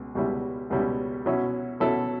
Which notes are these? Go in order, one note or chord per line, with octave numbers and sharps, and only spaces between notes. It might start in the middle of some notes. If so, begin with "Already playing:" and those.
Already playing: C#2 B2
C#2 B2 G3 C#4 E4
C#2 B2 G3 C#4 E4
B2 F#3 C#4 E4
B2 F#3 C#4 E4 A4